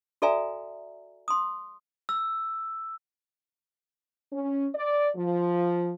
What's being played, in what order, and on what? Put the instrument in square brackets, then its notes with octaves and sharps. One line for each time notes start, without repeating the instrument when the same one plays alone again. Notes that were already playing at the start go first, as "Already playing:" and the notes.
[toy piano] F#4 A4 D5 E5 G#5 A#5
C6 D#6
[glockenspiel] E6
[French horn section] C#4
D5
F3